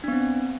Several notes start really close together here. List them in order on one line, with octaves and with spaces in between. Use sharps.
D4 B3 C4